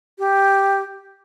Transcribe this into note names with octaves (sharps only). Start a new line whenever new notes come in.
G4